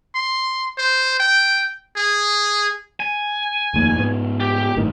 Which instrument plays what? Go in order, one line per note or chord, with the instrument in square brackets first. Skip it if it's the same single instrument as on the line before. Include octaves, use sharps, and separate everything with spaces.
[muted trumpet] C6
C5
G5
G#4
[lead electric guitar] G#5
[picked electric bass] F1 D#2
G#2 B3
[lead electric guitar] G4
[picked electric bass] G1 A2 D#3